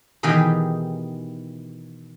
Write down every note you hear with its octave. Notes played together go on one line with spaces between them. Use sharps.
B2 D#3 E3 G4 G#4